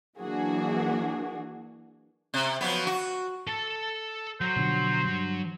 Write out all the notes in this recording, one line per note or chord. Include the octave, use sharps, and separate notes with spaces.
E3 F#3 A#3 D4 F#4 G#4
C3
F3 F#3 B3
F#4
A4 A5
F#3 C5
B2 D3 F3
G2